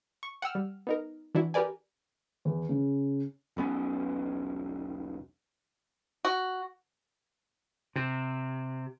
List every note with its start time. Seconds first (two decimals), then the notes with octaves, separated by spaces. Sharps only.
0.23 C#6
0.42 F#5 G5 E6 F6
0.55 G3
0.87 B3 D#4 A#4
1.35 E3 D4 E4 F#4
1.54 G4 A#4 B4 D5 G#5
2.45 E2
2.69 C#3
3.57 E1 B1 B3 C#4
6.25 F#4
7.96 C3